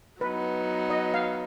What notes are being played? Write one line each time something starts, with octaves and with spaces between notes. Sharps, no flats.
F#3 B3 D#4 B4
D#5
F5